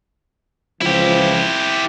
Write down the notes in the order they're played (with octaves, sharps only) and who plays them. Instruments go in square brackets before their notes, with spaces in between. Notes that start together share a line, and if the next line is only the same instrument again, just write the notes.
[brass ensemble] C#2 E3 F3 [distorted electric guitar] E4 G4